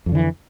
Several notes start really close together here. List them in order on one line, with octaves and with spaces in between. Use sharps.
F2 F3 D3 E3